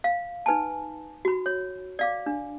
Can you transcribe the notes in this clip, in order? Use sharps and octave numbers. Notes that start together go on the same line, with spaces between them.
F5
D#4 B4 G#5 A5
F#4 B5
C#5
D5 F5 D6
D4